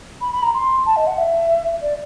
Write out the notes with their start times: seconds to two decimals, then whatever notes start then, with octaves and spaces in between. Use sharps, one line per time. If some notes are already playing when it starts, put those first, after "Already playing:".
0.21 B5
0.32 B5
0.42 A#5
0.54 C6
0.86 A5
0.96 D#5
1.07 F#5
1.18 E5
1.82 D5